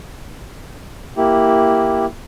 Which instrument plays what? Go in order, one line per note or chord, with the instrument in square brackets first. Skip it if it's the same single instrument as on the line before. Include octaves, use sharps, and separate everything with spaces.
[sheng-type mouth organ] A#3 E4 G4